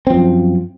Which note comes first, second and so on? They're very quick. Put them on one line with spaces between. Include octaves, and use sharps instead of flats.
C4 F3 F#2